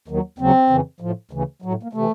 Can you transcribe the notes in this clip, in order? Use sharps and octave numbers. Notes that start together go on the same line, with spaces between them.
D#2 D#3 F#3
D#2 C#3 F#3 C4
F2 C#3 E3
A2 F3
D2 C#3 E3
A2 F#3
A#3
C3 E3 A3